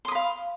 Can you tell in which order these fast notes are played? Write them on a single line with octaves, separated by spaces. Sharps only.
C6 D#6 B5 F5